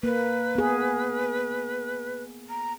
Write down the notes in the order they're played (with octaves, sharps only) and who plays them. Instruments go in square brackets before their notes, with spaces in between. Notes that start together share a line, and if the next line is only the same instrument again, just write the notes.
[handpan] A#3 [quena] B4
[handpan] B3 G#4
[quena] A#5